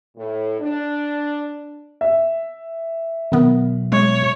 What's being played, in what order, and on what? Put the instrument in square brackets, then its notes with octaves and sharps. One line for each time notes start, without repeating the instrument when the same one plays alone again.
[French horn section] A2
D4
[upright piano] E5
[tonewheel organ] B2 F#3 [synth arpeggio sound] D#3 B3 A#4
[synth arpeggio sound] G#3 [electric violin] C#5